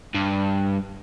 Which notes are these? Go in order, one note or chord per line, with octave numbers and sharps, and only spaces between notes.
G2